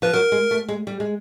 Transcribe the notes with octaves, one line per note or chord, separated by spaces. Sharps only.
F3 B4
F#3 A#4
G#3
A3
G#3
G3
G#3